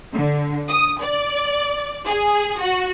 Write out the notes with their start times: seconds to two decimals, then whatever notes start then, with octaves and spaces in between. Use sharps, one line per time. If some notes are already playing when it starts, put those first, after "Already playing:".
0.13 D3
0.69 D#6
1.02 D5
2.07 G#4
2.61 F#4